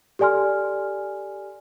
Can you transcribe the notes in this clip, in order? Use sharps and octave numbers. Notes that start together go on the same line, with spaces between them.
G4 A4 D5 G#5 C6 F6